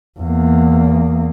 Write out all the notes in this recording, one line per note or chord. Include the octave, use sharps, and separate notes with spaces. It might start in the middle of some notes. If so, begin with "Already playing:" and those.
E2 A#3